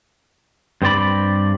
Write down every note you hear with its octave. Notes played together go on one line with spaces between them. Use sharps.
G2 C4 D5 B5